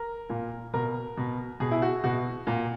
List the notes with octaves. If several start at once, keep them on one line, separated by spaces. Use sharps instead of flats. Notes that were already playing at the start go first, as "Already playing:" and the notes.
Already playing: A#4
A#2
B2 A#4
B2
B2 G#4
E4
F#4
B2 F#4
A#2